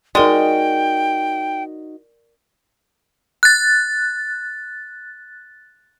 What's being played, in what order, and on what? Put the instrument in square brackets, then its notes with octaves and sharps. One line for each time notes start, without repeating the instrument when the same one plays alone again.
[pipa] G#3 [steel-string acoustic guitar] D#4 F#4 [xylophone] A#4 D5 [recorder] G5
[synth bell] F#6 A6